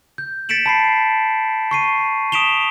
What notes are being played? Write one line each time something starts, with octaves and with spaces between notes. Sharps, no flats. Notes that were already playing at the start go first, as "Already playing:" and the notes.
G6
A6 B6 C#7 D7 E7 F#7
A5 B5 C7
C#6 C7 D#7
D#6 B6 D7 E7 F7 G7